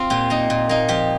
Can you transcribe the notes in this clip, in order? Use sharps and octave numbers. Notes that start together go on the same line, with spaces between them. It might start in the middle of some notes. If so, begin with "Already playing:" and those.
Already playing: C4 F4
A#2 G4
A#3 D#4
A#2
A#3 D#4
F3 G4